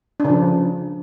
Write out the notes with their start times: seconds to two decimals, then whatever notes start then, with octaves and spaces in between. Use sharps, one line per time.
0.20 D4
0.25 C#3
0.29 F3